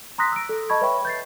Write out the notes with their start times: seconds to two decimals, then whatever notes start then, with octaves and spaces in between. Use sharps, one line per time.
0.18 A#5 C6 D#6 F#6 A#6 B6
0.32 E6 D7
0.49 A4
0.69 D#5 A5 B5 C#6 G#6
0.81 B4 C#5 E5 G5 B5 C#6
1.05 G6 A6 C7